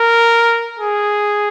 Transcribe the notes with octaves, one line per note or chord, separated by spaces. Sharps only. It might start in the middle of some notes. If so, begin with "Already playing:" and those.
Already playing: A#4
G#4